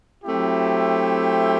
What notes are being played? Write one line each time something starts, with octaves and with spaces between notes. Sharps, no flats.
F#3 A3 C4 E4 G4